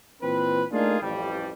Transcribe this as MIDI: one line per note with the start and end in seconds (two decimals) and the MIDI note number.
0.23 0.64 46
0.23 0.64 52
0.23 0.64 60
0.23 0.64 71
0.73 0.98 57
0.73 0.98 58
0.73 0.98 62
0.73 0.98 63
0.73 0.98 65
0.73 0.98 68
1.02 1.52 33
1.02 1.52 41
1.02 1.52 55